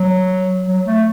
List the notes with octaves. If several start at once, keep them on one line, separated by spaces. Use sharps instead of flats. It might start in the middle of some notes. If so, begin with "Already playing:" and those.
Already playing: F#3
F#3
A3